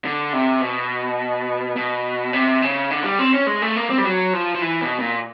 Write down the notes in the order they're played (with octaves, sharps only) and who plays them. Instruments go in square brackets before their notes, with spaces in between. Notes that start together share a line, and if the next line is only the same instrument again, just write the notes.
[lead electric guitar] D3
C3
B2
B2
C3
C#3
D3
G3
C4
C#4
G#3
A3
A#3
C4
G3
F#3
F3
F3
E3
B2
A#2